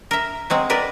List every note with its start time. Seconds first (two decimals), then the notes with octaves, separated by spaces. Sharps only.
0.11 A#4 E5
0.50 F#3 G#3 C4
0.70 A#4 B4 D5